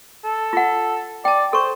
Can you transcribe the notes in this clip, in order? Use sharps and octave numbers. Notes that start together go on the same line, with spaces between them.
A4
F4 F#5
D5 G5 A5
A4 C5 C#6